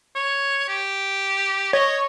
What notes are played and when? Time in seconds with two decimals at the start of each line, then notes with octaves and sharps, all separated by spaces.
0.16 C#5
0.69 G4
1.73 C#5 D#5